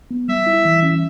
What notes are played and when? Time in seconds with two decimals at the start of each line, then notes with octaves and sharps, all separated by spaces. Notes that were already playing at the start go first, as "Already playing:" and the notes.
0.11 B3
0.28 G3 E5
0.46 E4
0.65 E3
0.83 C#4